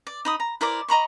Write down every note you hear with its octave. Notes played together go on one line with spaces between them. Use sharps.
D5
D#4 B5 D#6
A#5
E4 A#4 C5 D5
D#5 A#5 B5 C#6